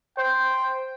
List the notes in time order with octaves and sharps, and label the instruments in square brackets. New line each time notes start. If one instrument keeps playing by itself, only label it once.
[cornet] C5 [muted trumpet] G5